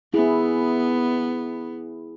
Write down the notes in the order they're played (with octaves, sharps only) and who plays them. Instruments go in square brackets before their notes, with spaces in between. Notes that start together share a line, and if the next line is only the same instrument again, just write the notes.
[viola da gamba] B3 [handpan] E4 G#4